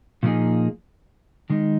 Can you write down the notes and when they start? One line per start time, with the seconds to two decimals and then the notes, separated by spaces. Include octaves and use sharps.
0.23 A#2 F3 A#3 D#4 G#4
1.50 D#3 G#3 D#4